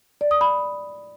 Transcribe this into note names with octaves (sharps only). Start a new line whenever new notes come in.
D5
D#6
B5